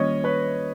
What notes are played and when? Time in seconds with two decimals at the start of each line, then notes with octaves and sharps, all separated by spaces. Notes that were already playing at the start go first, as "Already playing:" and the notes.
Already playing: D#3 G3 A#3 C#4 F4 C#5 D#5
0.24 B4 C#5